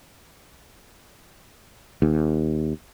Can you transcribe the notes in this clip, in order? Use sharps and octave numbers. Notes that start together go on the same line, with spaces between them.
D#2